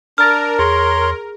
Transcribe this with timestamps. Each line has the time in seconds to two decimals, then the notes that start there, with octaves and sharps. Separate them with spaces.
0.18 D4 A#4 F6 A6
0.59 E2 G#4 C#5 C6